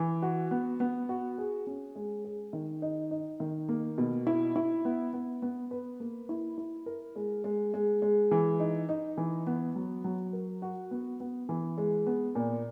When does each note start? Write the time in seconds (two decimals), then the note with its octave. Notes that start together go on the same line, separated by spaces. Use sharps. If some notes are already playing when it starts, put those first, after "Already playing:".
Already playing: E3
0.22 F#4
0.51 B3
0.80 B3
1.09 F#4
1.38 G#4
1.67 C#4
1.95 G#3
2.24 G#4
2.53 D#3
2.82 D#4
3.11 D#4
3.40 D#3
3.69 A#3
3.98 B2
4.27 E4
4.56 E4
4.85 B3
5.13 B3
5.42 B3
5.71 B4
6.00 A#3
6.29 E4
6.58 E4
6.86 A#4
7.16 G#3
7.44 G#3
7.74 G#3
8.02 G#3
8.31 E3
8.60 D#4
8.89 D#4
9.17 E3
9.47 B3
9.76 F#3
10.04 F#3
10.33 A#4
10.62 F#4
10.91 B3
11.20 B3
11.49 E3
11.78 G#3
12.06 B3
12.35 A#2